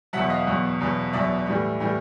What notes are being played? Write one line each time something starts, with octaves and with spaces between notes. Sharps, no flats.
E2 B2 F#3 E5 F#5
D#5 F5
E2 B2 F#3
E2 B2 F#3
E2 B2 F#3 D5 E5
A2 E3 G3
A2 E3 G3